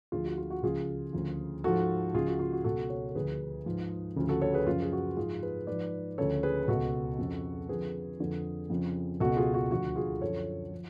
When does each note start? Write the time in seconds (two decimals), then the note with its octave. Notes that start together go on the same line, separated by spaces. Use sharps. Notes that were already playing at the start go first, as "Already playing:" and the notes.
0.12 D2 D3 F3 F4 G#4
0.25 F#4
0.38 F4
0.50 F#4
0.63 C#2 C#3 F3 F4 G#4
1.13 D2 C#3 F3
1.64 G#2 F3 F#4 A4
2.14 C#2 C#3 F3 F4 G#4
2.27 F#4
2.39 F4
2.52 F#4
2.64 C#2 B2 F#4 A4
2.90 A4 C#5
3.09 A4
3.15 D2 D3 F3 G#4 B4
3.66 G#2 F3
4.16 D2 C#3 F3
4.29 F#4 A4
4.41 A4 C#5
4.53 G#4 B4
4.66 F#2 C#3 F3 F4
4.82 G#4
4.92 F#4
5.17 G#2 F3 F4 G#4
5.43 G#4 B4
5.67 G#2 F3 B4 D5
6.18 D2 C#3 F3 A4 C#5
6.43 G#4 B4
6.68 C#2 B2 F#4 A4
7.19 F2 C#3 F3
7.69 F2 D3 F3 G#4 B4
8.19 F2 D3 F3
8.70 F2 C#3 F3
9.20 C#2 B2 F#4 A4
9.37 F4 G#4
9.54 F#4
9.71 D2 D3 F3 F#4
9.96 F4 G#4
10.21 F#2 D3 F3 A4 C#5
10.71 F3